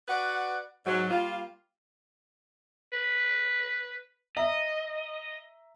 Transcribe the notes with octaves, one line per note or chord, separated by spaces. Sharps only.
F#4 B4 D5 F#5
G#2 F#3
G3 A#3 F4
B4
D#5 E5 A#5